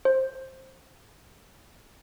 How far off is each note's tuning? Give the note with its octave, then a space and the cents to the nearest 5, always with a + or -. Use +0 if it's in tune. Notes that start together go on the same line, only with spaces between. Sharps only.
C5 +15